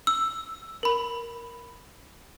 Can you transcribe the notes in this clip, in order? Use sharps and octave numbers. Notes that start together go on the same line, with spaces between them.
E6
A#4 B5